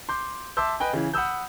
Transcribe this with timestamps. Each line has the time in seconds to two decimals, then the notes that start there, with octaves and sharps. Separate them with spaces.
0.09 C6 D6 G6
0.57 E5 A5 C6 D6 E6 G6
0.80 B4 D#5 G5 G#5
0.93 C#3 E3
1.14 F#5 B5 D#6 E6 G6